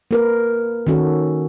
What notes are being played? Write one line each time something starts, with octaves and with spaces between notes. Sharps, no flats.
A#3 A#4 B4
D#3 C#4 F#4 A4